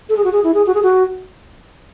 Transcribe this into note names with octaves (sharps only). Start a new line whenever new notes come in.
A4
G#4
F#4
G#4
E4
G#4
F#4
G#4
F#4